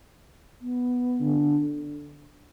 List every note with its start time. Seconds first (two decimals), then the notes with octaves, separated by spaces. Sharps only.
0.61 B3
1.20 D3